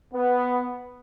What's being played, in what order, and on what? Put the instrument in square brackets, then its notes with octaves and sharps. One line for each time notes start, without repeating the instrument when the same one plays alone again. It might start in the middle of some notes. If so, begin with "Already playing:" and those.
[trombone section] B3